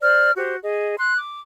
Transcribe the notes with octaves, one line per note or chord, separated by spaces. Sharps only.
C5 D5 F6
F#4 G4 C5
G#4 D#5
C6 F#6
D6